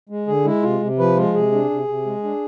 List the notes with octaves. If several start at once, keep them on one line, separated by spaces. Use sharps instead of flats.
G#3
D3 G#4
G#3 E4
C3 F4
C3
F3 B4
G#3 F4
C3 G#4
D4
C3
C3
G#3
D4